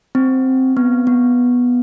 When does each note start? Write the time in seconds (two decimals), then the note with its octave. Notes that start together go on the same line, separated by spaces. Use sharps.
0.15 C4
0.77 B3
1.07 B3